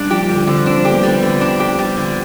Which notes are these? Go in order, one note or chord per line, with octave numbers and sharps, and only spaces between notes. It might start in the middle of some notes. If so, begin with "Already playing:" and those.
Already playing: G3 D4
F3 G4
D3 G3
D3 C4
C4 D4
G3
A3 G4
B3
G3 A3
B3
D3
D4
G4
G3
D3